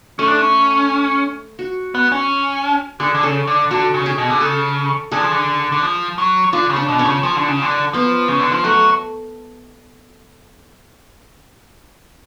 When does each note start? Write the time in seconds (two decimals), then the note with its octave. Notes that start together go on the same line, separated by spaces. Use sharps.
0.19 A3 C#4
0.28 D4
0.38 C#4
1.59 F#4
1.95 B3
2.12 C#4
3.00 D3 G#4
3.14 D3
3.23 C#3 A4
3.47 D3
3.71 D3 F#4
3.94 C#3
4.06 G#4
4.18 B2
4.30 D3
4.41 C#3 A4
5.12 D3 G#4
5.21 F3
5.31 D3
5.72 D3
5.82 F3
6.18 F#3
6.53 D3 F4
6.70 C#3
6.76 D4
6.88 B2
6.99 C#4
7.05 C#3
7.23 F3 C#4
7.36 D3
7.48 C#3
7.62 D3
7.93 F3 B3
8.28 C#3
8.40 D3
8.51 F3
8.64 F#3 A3